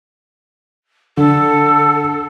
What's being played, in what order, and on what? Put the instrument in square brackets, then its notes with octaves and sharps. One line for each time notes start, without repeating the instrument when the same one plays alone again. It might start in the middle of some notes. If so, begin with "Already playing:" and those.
[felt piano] D3 [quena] A4